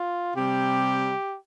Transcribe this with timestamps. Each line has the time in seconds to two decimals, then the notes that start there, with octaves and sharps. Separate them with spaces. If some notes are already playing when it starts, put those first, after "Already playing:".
Already playing: F4
0.35 C3 G3 G4